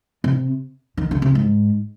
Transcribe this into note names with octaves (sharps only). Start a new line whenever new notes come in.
C3
D#3
D3
C3
G#2